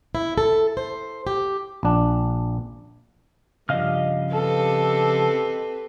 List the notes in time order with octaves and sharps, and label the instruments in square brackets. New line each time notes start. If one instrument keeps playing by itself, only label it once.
[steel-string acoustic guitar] E4
A4
C5
G4
[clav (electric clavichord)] A#1 D4
[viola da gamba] G2 [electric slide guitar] C#3 F3 [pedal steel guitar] D#5 F5 F6
[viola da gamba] C4 G4 B4 [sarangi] A4